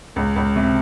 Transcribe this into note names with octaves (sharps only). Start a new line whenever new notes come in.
C#2
C#2
C3